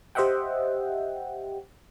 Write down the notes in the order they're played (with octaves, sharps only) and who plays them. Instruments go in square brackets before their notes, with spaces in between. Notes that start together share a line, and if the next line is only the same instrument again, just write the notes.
[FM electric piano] G4 C5 D#5 E5 F#5 G5